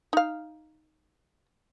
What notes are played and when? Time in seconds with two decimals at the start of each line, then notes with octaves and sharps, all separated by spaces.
0.13 D#4 F5